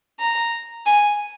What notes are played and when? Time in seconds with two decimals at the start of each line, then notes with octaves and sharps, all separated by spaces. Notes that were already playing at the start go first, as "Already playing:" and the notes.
0.20 A#5
0.86 G#5